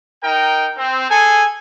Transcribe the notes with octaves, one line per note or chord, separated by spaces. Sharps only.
D#4 A#4 G5
C4
G#4 A4 G#5